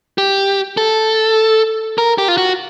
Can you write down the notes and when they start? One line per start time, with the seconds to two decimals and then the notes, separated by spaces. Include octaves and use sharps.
0.18 G4
0.77 A4
1.98 A#4
2.18 G4
2.28 F4
2.37 F#4